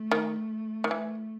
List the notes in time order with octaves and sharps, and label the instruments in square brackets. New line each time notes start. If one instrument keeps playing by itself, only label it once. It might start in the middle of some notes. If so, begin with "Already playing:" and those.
Already playing: [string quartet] A3
[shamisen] D#3
D#3
[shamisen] E3 [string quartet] A3